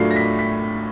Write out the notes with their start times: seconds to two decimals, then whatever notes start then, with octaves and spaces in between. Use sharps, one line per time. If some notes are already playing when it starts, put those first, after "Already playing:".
Already playing: A2 F#3 A3 D4 F4 C7
0.11 A#6
0.16 B6
0.39 B6